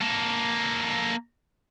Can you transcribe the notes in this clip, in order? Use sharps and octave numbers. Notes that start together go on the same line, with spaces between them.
A#3 A4